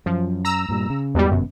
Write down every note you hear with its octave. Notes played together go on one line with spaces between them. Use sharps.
F#2 F3
A#5 E6
G2 A#2 G3
C#3
E2 G#2 B2 G3
G1 F#2 B2